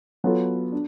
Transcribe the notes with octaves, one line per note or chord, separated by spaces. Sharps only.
F#3 B3 F4 A4
D4